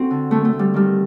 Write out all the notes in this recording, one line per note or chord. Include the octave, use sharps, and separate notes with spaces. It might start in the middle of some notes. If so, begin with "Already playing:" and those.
Already playing: C4 F#4 A4
D3
D3 A3
A3
D3
G3
D#3 G3